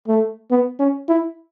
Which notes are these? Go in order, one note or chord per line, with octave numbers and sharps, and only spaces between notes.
A3
B3
C#4
E4